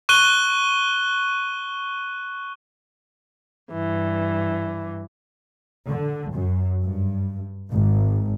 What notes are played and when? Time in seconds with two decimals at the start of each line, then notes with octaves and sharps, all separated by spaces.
0.09 C#6 F#6 D#7 G7
3.72 G2 E3
5.88 D3
6.34 F#2
6.83 G2
7.71 G#1